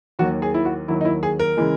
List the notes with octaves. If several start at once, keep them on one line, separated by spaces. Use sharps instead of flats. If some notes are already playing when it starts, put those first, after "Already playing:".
D#2 D#3 F#3 A#3 F#4
G#4
E4
F#4
D#2 D#3 F#3 A#3 E4
D#4
E4
G#4
A#4
C#3 E3 G#3